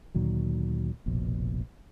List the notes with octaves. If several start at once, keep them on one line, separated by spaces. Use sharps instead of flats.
D2 A#2 D#3 F#3
F1 A#1 B2